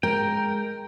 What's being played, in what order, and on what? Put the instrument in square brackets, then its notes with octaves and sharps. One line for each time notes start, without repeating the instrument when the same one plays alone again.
[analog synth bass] G#3 [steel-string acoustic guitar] A#4 [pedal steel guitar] G5